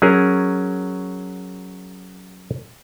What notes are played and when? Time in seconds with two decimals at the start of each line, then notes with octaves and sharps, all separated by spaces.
0.02 F#3 C#4 G#4 A#4